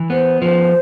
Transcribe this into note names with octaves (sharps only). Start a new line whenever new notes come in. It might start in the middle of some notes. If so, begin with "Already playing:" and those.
Already playing: E3
B3 C5
F3 C5